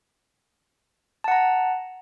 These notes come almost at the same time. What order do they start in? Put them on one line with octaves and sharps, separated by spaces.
A5 F#5 A#5